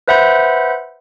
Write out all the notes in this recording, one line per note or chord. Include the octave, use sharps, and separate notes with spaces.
B4 C5 E5 F#5 B5 G6